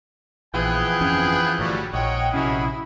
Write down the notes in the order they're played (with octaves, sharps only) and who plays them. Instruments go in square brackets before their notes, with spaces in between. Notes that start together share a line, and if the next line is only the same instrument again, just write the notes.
[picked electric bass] A#1 [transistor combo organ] E3 F3 [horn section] B3 G5 G#5 [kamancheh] G#4 F#6
[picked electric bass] G1 F2 C#4
[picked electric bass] G1 A2 [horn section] F#3 G3
[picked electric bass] A#1 [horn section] G#2 C#5 [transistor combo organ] D#5 F#5 [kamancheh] G5
[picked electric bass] A#1 C3 C#4 [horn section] F#2 G#4 C#5 [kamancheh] E4